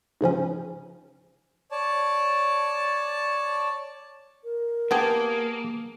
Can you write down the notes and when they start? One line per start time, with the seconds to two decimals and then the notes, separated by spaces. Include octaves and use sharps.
0.21 G#2 C#3 F3 C#4
1.71 C#5 D5 A5
4.44 A#4
4.91 A#3 B3 G4 G#4 G#5 A5